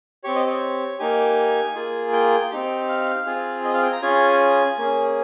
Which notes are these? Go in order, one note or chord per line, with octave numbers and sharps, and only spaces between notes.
C4 G4 C#5
D#5
C#5
A#3 D#4 G4 G#5
A#3 F4 G#4
G5
C4 D#4 G4
F5
C4 F4 G#4
D#5
F5
G5
A#5
C#4 F4 G#4 G#5
A#3 C#4 G#4